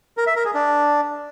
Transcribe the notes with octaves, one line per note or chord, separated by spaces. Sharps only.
A#4
E5
A#4
G#4
D4